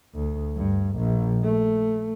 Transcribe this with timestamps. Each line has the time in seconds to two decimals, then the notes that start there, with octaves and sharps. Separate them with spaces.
0.15 D2
0.56 G2
0.98 A#1
1.44 A3